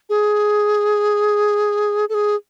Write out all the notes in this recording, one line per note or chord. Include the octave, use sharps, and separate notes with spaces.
G#4
A4
G#4